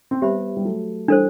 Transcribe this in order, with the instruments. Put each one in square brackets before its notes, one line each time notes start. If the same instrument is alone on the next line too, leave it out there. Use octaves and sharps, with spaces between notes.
[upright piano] C4
[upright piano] G3 B3 [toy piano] G4 C5 E5 B5
[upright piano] G3
F#3 A3
[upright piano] E3 G3 [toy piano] D4 A4 C5